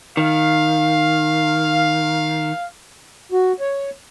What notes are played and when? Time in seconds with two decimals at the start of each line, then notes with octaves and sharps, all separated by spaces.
0.17 D#3 F5
3.32 F#4
3.60 C#5